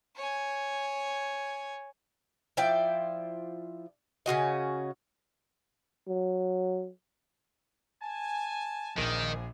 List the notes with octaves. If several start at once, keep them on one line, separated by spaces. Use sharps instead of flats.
C#5 G#5
F3 E4 D5 G5
C#3 C#4 F#4 D#5
F#3
G#5 A5
A#1 D#3 F3 C4 G#4